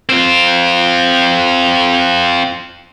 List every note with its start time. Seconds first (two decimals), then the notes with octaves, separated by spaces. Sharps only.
0.09 C4 F4